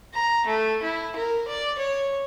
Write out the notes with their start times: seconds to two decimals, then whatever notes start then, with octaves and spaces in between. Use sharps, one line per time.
0.14 A#5
0.47 A3
0.83 E4
1.16 A#4
1.48 D5
1.79 C#5